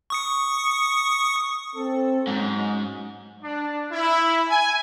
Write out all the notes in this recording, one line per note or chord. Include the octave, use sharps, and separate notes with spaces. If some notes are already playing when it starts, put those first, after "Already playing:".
C#6 D#6 C#7
C4 A4
G#2 F#3 C#4
D4
E4
G#5